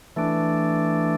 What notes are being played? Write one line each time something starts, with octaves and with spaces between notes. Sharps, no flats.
E3 A3 D4